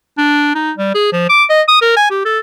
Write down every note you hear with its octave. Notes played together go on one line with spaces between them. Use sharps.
D4
D#4
G3
G#4
F3
D6
D#5
D#6
A#4
G#5
G4
A4